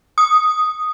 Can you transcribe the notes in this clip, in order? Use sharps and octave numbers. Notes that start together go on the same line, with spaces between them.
D#6